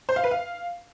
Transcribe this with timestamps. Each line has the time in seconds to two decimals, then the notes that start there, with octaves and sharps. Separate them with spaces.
0.09 C5
0.16 F5
0.24 B4
0.31 F5